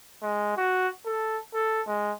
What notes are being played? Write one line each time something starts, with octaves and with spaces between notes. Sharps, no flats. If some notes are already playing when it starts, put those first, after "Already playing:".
G#3
F#4
A4
A4
G#3